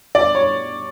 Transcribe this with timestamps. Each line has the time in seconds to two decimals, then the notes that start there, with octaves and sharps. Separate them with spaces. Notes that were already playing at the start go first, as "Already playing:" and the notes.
0.15 D5
0.35 C#5